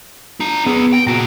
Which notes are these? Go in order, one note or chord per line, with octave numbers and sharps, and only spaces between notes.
D4 A#5
B3 G#4 B4
G5
A#2 F#4 A#5